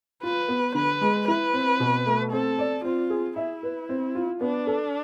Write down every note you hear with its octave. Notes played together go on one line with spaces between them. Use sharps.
F4 B4
B3
D3 B4
G#3
E4 B4
C4
B2
A3
C4 A4
D5
C4 F4
G#4
E4 E5
B4
C4
F4
B3 D4
A4